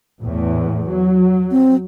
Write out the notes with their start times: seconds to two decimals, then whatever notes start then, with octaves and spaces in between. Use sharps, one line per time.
0.22 E2 A2
0.89 F#3
1.51 C4